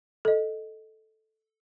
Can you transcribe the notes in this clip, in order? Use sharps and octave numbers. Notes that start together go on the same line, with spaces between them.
A4 D#5